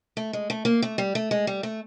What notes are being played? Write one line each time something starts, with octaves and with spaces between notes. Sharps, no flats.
A3
G#3
A3
A#3
A3
G3
A3
G#3
G3
A3